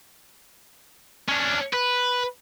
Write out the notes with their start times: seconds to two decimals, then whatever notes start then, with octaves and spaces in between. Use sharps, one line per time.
1.29 C#4 D4
1.74 B4